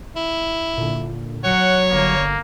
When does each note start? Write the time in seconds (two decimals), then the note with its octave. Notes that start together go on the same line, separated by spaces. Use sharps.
0.16 E4
0.77 A#2 D3
1.44 F#3 C#5 F#5
1.92 G1 D3 A#3